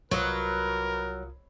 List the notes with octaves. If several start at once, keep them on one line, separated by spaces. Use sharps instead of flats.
C2 F#3 F4 A#4 B4 D#6